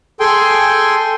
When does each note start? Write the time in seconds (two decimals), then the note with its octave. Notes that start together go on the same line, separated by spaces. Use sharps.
0.20 G#4 A4 G5 G#5 C6